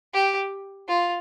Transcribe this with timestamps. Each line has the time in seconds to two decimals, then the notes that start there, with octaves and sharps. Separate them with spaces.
0.14 G4
0.88 F4